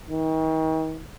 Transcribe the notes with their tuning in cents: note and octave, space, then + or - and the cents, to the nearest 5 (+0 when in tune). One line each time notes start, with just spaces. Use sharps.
D#3 +40